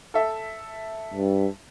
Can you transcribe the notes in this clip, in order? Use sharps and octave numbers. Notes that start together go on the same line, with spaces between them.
A4 E5
G2